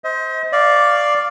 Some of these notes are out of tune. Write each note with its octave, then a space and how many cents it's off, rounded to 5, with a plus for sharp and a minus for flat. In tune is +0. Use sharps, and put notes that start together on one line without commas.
C5 +0 D#5 +40
D5 +0 F5 +0 C#6 +30